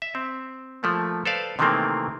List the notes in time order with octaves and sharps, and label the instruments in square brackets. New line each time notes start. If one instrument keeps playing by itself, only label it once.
[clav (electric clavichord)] E5
C4
F3 A3 A#3
A4 B4 C5 D5 F5
C3 D#3 E3 A3 A#3 C4